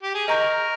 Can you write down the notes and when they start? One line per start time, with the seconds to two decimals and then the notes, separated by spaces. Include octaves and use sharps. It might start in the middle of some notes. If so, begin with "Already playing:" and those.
0.03 G4
0.14 G#4
0.28 A#4 D#5 A#5 C#6 G6